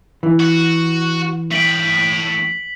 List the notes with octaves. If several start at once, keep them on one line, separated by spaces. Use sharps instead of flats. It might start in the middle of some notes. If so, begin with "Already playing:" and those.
E3
F#4
A3 G5 B6 F#7